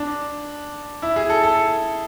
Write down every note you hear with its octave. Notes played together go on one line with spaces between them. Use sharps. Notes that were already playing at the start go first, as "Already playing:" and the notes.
Already playing: D4
E4
G#4
A4
A4